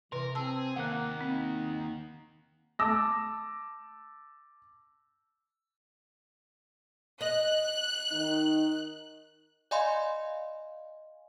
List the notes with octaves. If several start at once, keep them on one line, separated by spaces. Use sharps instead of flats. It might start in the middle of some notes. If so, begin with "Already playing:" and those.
C3 E3 A#4 B4
C4 G#4 A5 E6
D#2 A#3 F#5 F#6
C4 D#4
A5 D6 E6 A#6
D#5 F#6
D#3 D#4
D5 D#5 F5 G#5 B5 C6